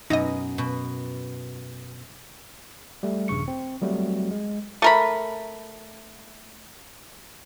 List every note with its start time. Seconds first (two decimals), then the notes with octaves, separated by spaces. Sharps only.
0.10 F#2 B2 D#4 D#5
0.58 B2
3.03 G3 A3
3.28 A#1 G2 C#3 C#6 C#7
3.48 C4
3.82 F#3 G3 A3 C4 F#4
4.31 G#3
4.82 A3 A#4 B5